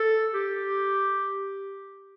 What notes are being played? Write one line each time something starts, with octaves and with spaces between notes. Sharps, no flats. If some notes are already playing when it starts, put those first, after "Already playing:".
Already playing: A4
G4